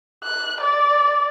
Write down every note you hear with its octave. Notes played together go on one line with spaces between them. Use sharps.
F#6
D5